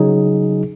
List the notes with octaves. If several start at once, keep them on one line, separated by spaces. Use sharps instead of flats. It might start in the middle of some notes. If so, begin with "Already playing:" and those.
Already playing: C#3 F#3 D#4 G#4